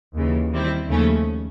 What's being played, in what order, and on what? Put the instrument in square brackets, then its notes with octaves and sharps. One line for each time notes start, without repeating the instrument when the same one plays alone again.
[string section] D#2 C#3 E3
D#3 G3 C4 E4
D#2 C#3 F3 A3 C#4